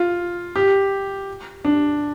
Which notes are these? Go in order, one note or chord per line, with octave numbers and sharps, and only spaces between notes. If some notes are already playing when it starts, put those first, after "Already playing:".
Already playing: F4
G4
D4